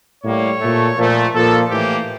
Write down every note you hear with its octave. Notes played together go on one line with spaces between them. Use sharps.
A2 G3 A#3 C#5
A#2 A3
A#2 F3 A3
A#2 F3 A#3 A4
A2 E3 A#3 G4